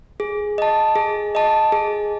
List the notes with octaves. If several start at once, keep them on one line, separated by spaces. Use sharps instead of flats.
G#4
D#5 A5
G#4
D#5 A5
G#4